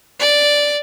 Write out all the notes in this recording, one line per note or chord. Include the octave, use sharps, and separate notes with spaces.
D5